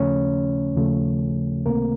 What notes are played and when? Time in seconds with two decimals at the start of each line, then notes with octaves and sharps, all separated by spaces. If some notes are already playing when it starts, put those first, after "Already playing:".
Already playing: D#2 C#3 F3 A3 C#4 C#5
0.75 D#2 C#3 F3 A3
1.66 C#2 C3 D#3 A3 A#3 C4 A#4